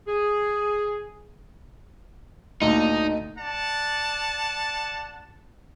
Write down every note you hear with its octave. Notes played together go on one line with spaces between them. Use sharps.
G#4
D2 A#2 D#4
D5 F#5 A5